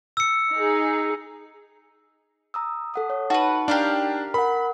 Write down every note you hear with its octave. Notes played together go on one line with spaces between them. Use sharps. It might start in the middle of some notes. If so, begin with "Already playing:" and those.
E6 C#7
D#4 G#4
A#5 D#6 E6
A4 F#5 D#6
C#5
D#4 F#4 B4 A5
D4 G4 A#4 F5
A#4 F#5 B5